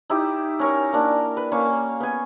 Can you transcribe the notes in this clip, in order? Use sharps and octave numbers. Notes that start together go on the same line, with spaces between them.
D#4 E4 G4 D6
C#4 A#4 C#5
A#3 D4
B4
A#3 C#4 F5 C#6
B3 G#5